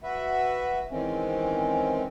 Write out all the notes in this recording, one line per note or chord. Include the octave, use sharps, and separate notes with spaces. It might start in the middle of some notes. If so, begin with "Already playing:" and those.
F#4 B4 E5
D#3 E3 G#3 C4 C#4